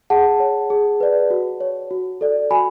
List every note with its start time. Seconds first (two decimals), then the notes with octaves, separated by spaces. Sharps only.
0.10 G#4 F#5 A5
0.40 C#5
0.70 G#4
1.00 B4 D5
1.30 F#4
1.60 C#5
1.91 F#4
2.21 A4 D5
2.51 F#4 G#5 B5